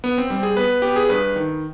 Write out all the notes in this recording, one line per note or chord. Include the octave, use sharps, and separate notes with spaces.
B3
C4
G3 C4
G#4
B3 B4
B3 G4
G#4
G2 B4
D#3